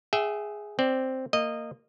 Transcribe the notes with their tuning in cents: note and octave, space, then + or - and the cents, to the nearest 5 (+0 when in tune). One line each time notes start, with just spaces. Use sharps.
G#4 +0 E5 +0 G5 -35
C4 +0 D5 +0
A#3 -20 D#5 -10